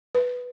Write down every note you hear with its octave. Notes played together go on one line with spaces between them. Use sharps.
B4